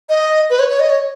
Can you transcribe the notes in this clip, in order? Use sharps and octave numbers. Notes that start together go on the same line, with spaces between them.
D#5
B4
C#5
C#5
D#5
C#5